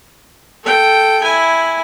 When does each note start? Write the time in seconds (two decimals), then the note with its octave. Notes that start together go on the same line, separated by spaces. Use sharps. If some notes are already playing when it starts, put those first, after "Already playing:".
0.63 A4 G5
1.23 E4 G#5